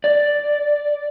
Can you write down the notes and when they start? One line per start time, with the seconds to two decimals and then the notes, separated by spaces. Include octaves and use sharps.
0.04 D5